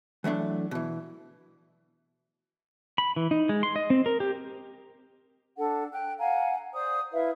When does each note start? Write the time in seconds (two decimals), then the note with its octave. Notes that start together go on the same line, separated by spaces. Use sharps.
0.24 E3 F#3 A3 D4
0.71 B2 E3
2.98 B5
3.16 E3
3.31 D#4
3.49 G#3
3.63 C6
3.76 D#5
3.90 C4
4.06 A#4
4.20 G4
5.57 D4 A4 F#5
5.92 G5 F#6
6.19 F5 F#5 G#5 A#5
6.74 C5 D5 D#6
7.13 E4 B4 E5 F5